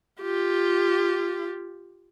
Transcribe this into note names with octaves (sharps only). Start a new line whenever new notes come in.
F4 G4